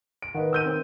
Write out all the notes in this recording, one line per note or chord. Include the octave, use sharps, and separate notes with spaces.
D7
D#3 B4 D#5 F#5
E6 G6 D#7
C4 C5